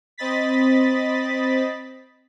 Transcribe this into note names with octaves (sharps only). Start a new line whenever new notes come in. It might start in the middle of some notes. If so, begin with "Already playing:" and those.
C4 D#5 B5 A6 B6